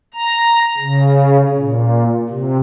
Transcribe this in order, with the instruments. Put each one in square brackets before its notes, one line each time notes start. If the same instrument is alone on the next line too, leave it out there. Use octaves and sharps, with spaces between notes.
[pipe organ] A#5
C#3
A#2
C3